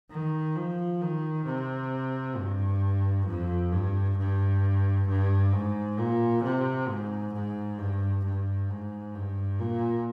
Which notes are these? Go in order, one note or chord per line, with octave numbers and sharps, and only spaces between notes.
D#3
F3
D#3
C3
G2
F2
G2
G2
G2
G#2
A#2
C3
G#2
G#2
G2
G2
G#2
G2
A#2